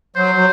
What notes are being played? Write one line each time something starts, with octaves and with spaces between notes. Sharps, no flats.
F#3 C5
F#3